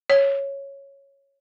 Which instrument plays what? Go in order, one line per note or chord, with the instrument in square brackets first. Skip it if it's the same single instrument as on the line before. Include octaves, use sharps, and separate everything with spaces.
[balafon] C#5